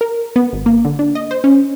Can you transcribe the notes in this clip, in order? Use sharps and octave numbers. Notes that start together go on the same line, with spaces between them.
A#4
B3
G#1
A#3
D3
D4
D#5
C5
C#4